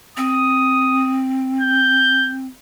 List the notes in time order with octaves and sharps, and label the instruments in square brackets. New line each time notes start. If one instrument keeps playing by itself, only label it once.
[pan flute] C4 [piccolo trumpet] D#6
[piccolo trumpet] G6